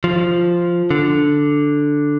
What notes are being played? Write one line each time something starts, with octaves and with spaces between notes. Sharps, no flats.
F3
D3